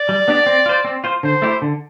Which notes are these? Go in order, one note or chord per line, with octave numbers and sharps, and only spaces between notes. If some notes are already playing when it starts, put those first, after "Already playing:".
Already playing: D5
G3
B3 D4 G4
C4
F4 C5
C4
F4 C5
D3 C5
A3 E4 G4
D3